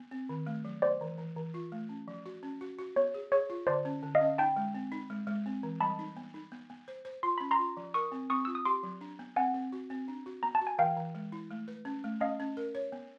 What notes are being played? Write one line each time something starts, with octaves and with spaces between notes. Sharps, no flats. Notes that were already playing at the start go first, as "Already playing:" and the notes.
Already playing: B3
C4
D#3
A3
F#3
B3 C5 D5
E3
E3
E3
F4
A3
C#4
F3
F#4
C#4
F#4
F#4
B3 C#5
G#4
G#4 C#5
F4
D3 C5 D5
C#4
D3
D#5 F5
C#4
D#4 G5 A5
G#3
C4
D#4
G#3
G#3
C4
E3
G3 A5 B5
D#4
B3
D#4
B3
B3
C5
C5
F4 C6
C#4 B5
A#5 C6
F4
F3
A#4 C#6 D#6
C4
C4 C#6 D#6
F4 E6
D#6
G4 C6 D6
F#3
D4
B3
C4 F#5 G#5
C4
F#4
C4
D4
F#4
B3 A#5
A5
F#4
G#5
E3 F5 G5
E3
G#3
E4
A3
B4
C#4
A3
C#4 D#5 F5
C#4
A#4
C#5
B3